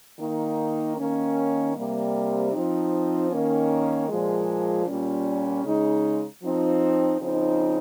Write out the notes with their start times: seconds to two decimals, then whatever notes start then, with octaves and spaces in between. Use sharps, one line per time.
0.20 D#3 A#3 D#4
0.97 D#3 A#3 C#4
1.75 C3 G3 A#3
2.53 F3 C4 D#4
3.31 D#3 A#3 C#4
4.09 A#2 F3 G#3
4.86 A#2 G3 C#4
5.64 C#3 G#3 D#4
6.42 F3 C4 D#4
7.20 C#3 F3 C4 D#4